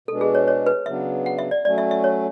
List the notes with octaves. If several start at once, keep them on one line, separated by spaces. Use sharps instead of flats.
B2 G#3 D4 A4
G#4
C#5
C#5
B4
C#3 F#3 B3 D4 E5
F#5
E5
D5
F#3 A3 C#4 D5
E5
E5
C#5